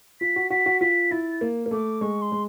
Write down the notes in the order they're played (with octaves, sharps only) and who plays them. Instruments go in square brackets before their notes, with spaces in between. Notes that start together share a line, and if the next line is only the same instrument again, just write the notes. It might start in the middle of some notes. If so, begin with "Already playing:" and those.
[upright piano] F4 [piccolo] B6
[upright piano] F#4
[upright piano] F#4 [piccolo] B6
[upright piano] F#4
[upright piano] F4 [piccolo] B6
[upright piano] E4 [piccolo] A6
[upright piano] A#3
A#3
[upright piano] A3 [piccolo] D6
[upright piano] G#3 [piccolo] C#6
[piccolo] C6
[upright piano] G#3